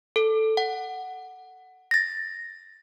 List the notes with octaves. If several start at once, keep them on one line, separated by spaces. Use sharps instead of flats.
A4
F#5
A6 A#6